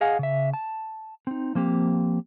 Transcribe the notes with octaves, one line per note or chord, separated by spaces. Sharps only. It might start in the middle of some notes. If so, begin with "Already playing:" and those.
G#4 D#5 F5 F#5 G#5
C#3 E5
A5
C4 D#4
F3 A#3 C4 G4